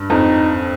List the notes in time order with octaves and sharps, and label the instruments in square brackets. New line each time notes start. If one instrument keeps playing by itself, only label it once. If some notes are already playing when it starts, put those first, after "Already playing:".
Already playing: [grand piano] G2
[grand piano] F2 [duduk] D#4